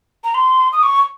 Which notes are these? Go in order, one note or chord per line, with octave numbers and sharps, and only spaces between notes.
A#5
C6
D#6
C#6